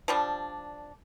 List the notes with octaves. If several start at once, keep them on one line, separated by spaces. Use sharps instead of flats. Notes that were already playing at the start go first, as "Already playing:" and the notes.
F3 G3 D4